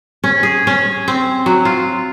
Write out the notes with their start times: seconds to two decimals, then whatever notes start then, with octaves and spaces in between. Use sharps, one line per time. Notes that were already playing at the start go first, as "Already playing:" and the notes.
0.24 C#4
0.43 G#4
0.67 C#4
1.08 C4
1.46 F#3
1.65 F4